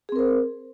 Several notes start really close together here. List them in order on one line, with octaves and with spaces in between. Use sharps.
G#4 C4 A#4 C5